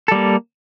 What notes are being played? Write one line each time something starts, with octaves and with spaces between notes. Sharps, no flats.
G3 A#3 A4